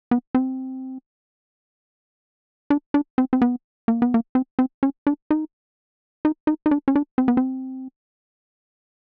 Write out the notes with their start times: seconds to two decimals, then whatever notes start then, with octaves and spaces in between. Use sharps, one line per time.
0.11 B3
0.35 C4
2.70 D4
2.94 D4
3.18 C4
3.33 C4
3.42 B3
3.88 A#3
4.02 B3
4.14 A#3
4.35 C4
4.59 C4
4.83 C#4
5.07 D4
5.31 D#4
6.25 D#4
6.47 D#4
6.66 D#4
6.71 D4
6.88 C#4
6.96 D4
7.18 C4
7.28 B3
7.37 C4